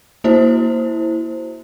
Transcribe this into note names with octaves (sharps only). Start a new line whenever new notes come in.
A#3 E4 F#4 C5